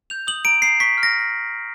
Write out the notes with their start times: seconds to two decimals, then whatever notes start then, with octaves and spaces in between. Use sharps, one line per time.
0.10 G6 F7
0.27 D#6 F#7
0.45 A#5 D7
0.62 A#5 C7
0.80 C#6 B6
0.98 F6
1.03 A#6